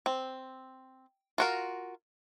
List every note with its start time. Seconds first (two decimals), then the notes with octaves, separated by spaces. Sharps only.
0.06 C4
1.38 F4 F#4 A#4